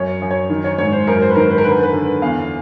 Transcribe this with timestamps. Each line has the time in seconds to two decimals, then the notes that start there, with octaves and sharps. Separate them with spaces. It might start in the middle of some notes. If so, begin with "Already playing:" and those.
Already playing: F#2 C#5
0.22 F#2
0.31 C#5
0.50 D#3
0.64 C#5
0.78 G#2 C#5
0.92 C5
1.07 F#2 A#4
1.22 C5
1.30 B4
1.36 D#3 A#4
1.50 B4
1.58 A#4
1.64 D3 B4
1.83 B4
1.93 D3
2.22 E2 F5